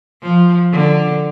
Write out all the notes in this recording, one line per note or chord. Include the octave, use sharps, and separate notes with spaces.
F3
D3